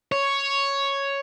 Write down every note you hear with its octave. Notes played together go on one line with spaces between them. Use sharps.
C#5